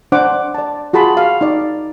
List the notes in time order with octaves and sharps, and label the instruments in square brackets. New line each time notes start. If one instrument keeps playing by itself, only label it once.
[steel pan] D4 C5 F#5 D6
D5 A5
F4 F#4 G#4 A5 B5 C6
F5
D#4 D5